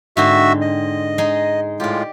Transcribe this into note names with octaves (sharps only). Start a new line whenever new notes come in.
G#2 D3 C4 F#4 E5
D#5
G#3 D#4 G#4
A2 G#3 F4 G4 D5